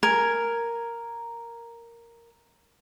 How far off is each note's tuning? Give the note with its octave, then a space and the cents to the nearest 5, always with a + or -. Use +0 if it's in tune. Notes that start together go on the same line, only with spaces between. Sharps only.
A#4 +0 G#5 +0